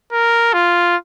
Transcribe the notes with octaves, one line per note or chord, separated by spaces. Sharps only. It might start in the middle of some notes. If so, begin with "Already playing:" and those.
A#4
F4